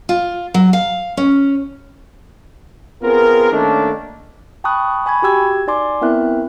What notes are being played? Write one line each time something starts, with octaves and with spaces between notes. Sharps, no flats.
F4
F#3
F5
C#4
B3 C4 F4 G#4 A#4
D#3 A3 A#3 C#4 D4
G5 A5 B5 C#6 D#6 F#6
G#5 B5 C#6 G#6
F#4 G4 G5 E6 G#6
D#4 D5 G#5 C6 D6
B3 C4 E4 A#4 E5 F#6